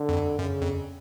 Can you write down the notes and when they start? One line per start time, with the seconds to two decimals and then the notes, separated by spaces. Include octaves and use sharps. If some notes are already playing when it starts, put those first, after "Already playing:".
Already playing: D3
0.09 F2
0.39 F#2 C#3
0.62 F2